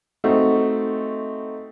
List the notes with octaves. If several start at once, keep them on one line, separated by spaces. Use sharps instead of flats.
A3 C4 D#4 F#4